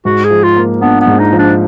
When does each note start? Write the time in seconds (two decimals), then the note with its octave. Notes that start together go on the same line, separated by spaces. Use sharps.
0.05 G#2 F#4
0.25 G#4
0.31 F3
0.44 F4
0.56 A#3
0.81 B3 D4
1.01 B3
1.07 G#2
1.19 D#4
1.33 F3
1.39 D4